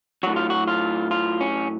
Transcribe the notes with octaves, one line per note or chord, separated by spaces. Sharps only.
A2 F#3 F#4
F4
F#4
F4
F4
C#4